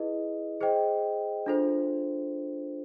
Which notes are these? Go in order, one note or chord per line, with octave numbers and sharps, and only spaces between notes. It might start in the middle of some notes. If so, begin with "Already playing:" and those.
Already playing: E4 G#4 B4 D#5
G#4 C5 D#5 G5
D4 F4 A4 C5